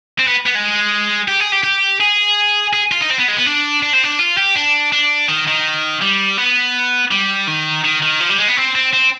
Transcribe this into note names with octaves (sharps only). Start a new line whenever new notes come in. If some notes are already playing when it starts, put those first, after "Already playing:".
C4
B3
B3
G#3
G4
G#4
G4
G4
G#4
G#4
F4
D#4
C4
B3
G#3
B3
D4
D4
C4
D4
F4
G4
D4
D4
D#3
D#3
G3
B3
G3
D#3
D#3
D#3
F3
G3
G#3
B3
C4
C4
C4